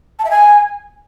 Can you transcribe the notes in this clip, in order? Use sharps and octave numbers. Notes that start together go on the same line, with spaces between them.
A5
E5
G#5